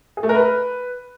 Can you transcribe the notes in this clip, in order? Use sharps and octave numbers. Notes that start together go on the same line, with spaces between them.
G#4
A3
A#4
B4